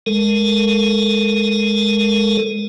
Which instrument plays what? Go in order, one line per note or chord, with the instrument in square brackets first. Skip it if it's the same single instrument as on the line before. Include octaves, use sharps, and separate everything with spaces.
[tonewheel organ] G#3 A4 A#4